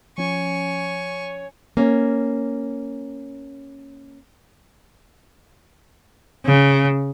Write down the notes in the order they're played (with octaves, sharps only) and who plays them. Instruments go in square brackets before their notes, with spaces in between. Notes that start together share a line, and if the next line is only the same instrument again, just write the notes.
[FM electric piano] F3 C#4 [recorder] C#5 [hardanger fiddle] G#5 C#6
[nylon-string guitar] A#3 C#4
[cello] C#3